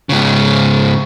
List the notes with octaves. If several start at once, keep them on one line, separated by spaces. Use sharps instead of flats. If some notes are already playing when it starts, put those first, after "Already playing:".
G#2 C#3